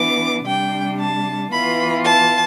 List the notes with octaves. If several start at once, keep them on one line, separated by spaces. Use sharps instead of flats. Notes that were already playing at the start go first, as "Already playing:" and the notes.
Already playing: E3 B3 D4 D6
C3 G3 D4 G5
A5
E3 B3 F4 B5
A5